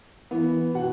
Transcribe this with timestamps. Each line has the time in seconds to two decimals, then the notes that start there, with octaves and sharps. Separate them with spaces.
0.31 E3 B3
0.74 B2 F#5